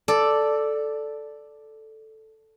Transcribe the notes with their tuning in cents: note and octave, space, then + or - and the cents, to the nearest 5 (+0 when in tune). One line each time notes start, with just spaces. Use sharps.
A4 +0 D5 +0